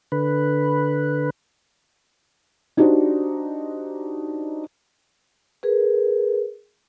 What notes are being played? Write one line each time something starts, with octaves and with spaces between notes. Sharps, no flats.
D3 B4
D4 D#4 F#4 G4 C5 D5
G#4 A#4 B4